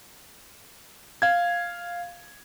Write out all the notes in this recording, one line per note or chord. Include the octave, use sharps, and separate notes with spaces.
F5 G#6